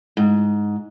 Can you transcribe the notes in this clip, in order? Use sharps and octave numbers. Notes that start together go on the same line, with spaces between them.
G#2